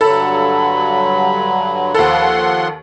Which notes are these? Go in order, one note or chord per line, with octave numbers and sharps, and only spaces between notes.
G2 D3 F#3 A4 B5
D#2 F3 A4 F#5 C6